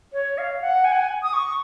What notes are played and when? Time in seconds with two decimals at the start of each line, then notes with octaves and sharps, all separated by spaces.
0.13 C#5
0.38 F5
0.62 F#5
0.84 G#5
0.92 F#5
1.00 G#5
1.23 D#6
1.33 C#6